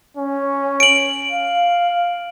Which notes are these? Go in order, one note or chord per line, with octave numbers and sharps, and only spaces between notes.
C#4
D7 F#7
F5